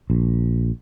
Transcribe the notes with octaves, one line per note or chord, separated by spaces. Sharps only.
A#1